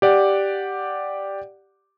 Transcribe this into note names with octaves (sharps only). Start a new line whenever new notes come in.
G4 D5 F#5